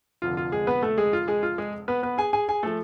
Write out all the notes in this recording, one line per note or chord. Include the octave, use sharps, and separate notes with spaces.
F1 F2 D3 F4
F4
G#3 G#4
B3 B4
A3 A4
G#3 G#4
F4
G#3 G#4
F4
G#3 G#4
B3 B4
B3 B4
G#4 G#5
G#4 G#5
G#4 G#5
F3 A3 A4